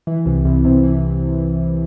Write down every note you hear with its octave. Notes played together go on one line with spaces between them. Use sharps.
E3
C2
C2
C3
E3